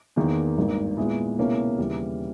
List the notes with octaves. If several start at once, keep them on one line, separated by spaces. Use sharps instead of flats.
E2 D#3 A#3 D#4
G#1 G2 D#3 A#3
A#2 G#3 B3 E4
C#2 B2 A#3 C#4 E4
D#2 C#3 E3 G3